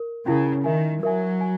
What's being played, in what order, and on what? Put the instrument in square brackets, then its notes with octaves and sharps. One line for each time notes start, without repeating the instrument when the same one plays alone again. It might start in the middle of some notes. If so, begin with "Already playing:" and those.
Already playing: [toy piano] A#4
[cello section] C#3 [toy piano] C#4 E4 A#4
[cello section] D#3 [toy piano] A#4 E5 G#5
[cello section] F#3 [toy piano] A#4 E5 G#5
[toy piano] G#5